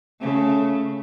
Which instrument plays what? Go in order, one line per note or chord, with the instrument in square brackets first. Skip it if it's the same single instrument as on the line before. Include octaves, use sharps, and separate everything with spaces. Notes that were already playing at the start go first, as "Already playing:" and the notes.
[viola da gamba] C#3 A3